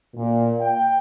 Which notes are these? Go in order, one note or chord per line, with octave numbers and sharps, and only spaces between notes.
A#2
G5